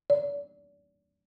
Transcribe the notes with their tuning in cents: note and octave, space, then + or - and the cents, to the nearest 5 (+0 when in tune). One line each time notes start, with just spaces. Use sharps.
D5 -35